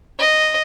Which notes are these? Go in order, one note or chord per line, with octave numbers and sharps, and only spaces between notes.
D#5